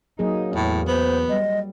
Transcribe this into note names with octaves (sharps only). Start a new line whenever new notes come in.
F#3 A#3 D#4 G#4
E2 A2
B3 C5
G3 D#5